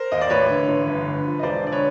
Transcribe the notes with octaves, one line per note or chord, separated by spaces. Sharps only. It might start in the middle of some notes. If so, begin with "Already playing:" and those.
Already playing: A#4 C5
D#2 D#5
D5
A1 B4 C#5
D3
A1
G1
D3
F3
D#5
E1 C5 D5
D3 D5
B4 C#5